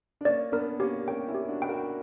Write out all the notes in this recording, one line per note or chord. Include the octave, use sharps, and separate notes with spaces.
D4
A#3 C#4 D5
B3 D4 A#4
A#3 C#4 G4
A#3 C#4 G5
C#4 E4
G4
D4 F#4
B4 G5
F#4 A#4